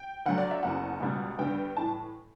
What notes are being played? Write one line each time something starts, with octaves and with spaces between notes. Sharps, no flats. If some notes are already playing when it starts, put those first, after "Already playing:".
Already playing: G5
D2 D3 F#3 F#5
D5
E5
F#1 E2 C#3 F#5
C#2 B2 G3
G2 D3 G3 B3 G5
A2 E3 A5